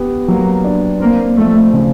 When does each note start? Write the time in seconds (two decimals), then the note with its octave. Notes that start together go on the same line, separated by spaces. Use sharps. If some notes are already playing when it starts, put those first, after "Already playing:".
Already playing: B3 G4
0.28 F#3 A#3
0.64 D4
1.00 A#3 C4
1.37 F3 A3
1.73 C#3